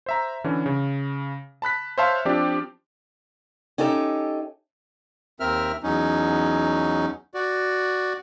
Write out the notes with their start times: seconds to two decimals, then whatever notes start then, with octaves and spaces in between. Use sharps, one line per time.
0.06 C5 E5 A#5
0.44 D3 E3 C#4
0.66 C#3
1.62 A5 B5 F#6 B6
1.98 C5 C#5 E5 F5 A5 C6
2.25 F3 C4 D4 G4 D5
3.78 C#4 D#4 G4 A4 E5
5.40 D#2 C4 A#4 E5 F6
5.83 E2 F#3 C#4 D#4
7.34 F#4 D5